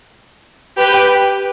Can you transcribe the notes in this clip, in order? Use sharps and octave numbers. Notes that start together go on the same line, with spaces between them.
G4 B4